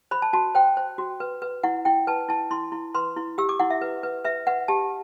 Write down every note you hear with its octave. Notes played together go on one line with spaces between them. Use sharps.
C5 B5
A5
F#4 A5
C5 G5
C5
F#4
B4
B4
E4 F#5
E4 G5
B4 A5
E4 A5
E4 C6
E4
B4 C6
E4
G4 E6
D6
E4 F#5
E5
B4
B4
B4 E5
B4 F#5
G4 A5